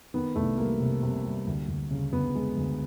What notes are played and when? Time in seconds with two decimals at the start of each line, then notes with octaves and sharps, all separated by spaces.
0.14 D#3 B3
0.36 C2 A3
0.58 G3 A#3
0.80 C3
1.03 C3
1.25 G3
1.46 D2
1.68 D2
1.91 C#3
2.13 D2 B3
2.35 G#3
2.57 D2